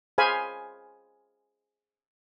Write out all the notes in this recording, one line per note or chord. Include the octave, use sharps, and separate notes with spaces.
G#4 C5 F5 G#5 B5